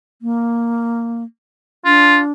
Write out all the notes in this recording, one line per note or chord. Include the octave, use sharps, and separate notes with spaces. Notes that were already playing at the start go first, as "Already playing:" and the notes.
A#3
D4 F4